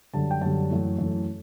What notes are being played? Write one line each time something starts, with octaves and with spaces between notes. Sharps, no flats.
F#2 D3 G3 A5
G5
F#2 D3 G3 A5
F#2 E3 A3
F#2 E3 A3